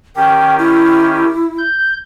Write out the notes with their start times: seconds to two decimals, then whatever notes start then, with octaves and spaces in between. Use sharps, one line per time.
0.16 D#3 C#4 G4 G5
0.59 E4
1.58 G6